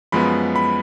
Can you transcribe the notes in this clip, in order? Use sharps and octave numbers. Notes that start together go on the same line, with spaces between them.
F#2 F3 G#3 B3 B5
B5